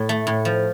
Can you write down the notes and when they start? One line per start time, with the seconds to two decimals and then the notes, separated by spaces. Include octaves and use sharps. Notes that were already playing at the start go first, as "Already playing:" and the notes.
Already playing: A2
0.09 A3
0.27 A2
0.45 F3